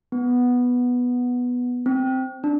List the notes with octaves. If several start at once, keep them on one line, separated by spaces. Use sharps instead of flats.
B3
C4
D4